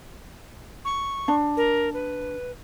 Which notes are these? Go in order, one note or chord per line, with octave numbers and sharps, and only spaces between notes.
C#6
D4
A#4
B4